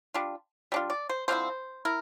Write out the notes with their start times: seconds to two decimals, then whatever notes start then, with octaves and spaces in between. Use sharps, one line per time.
0.14 G3 D4 F4
0.72 G3 D4 F4
0.90 D5
1.09 C5
1.28 D3 F3 C4 E4 C5
1.85 E4 A#4